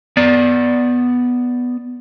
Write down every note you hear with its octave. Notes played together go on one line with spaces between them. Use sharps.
B3 D5